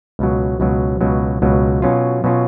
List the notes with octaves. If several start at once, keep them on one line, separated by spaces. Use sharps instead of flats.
C#2 B2 F#3
C#2 B2 F#3
C#2 B2 F#3
C#2 B2 F#3
B2 F#3 C#4 F4
B2 F#3 C#4 F4